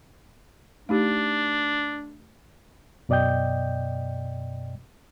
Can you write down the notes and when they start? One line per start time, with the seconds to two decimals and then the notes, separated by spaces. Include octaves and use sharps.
0.89 A3 D4 D#4 G4
3.09 F#2 B2 D5 D#5 G5 G6